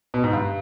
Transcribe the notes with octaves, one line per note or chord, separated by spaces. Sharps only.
B2
G#2
G2